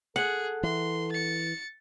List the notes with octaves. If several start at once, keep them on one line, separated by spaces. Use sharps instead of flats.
G#4 A4 F#5
E3 C6
A6 C#7